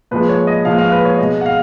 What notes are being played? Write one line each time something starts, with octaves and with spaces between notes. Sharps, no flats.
A#2 F3 G#3 B4
C#5
D#5
A#2 F3 G#3 F5
F5
B4
C#5
B2 G#3 D#5
F#5
F5